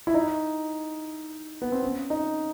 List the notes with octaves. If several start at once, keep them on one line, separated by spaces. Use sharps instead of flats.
E4
D#4
B3
C4
C#4
D#4